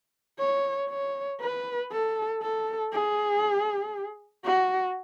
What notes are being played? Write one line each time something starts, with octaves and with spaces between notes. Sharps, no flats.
C#5
C#5
B4
A4
A4
G#4
F#4